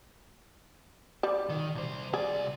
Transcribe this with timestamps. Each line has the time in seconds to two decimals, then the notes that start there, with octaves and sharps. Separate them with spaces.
1.23 G3
1.49 D#3
1.75 C2 C5
2.14 C2 G#4 D5